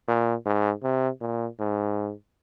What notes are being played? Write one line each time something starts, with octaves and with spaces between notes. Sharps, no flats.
A#2
G#2
C3
A#2
G#2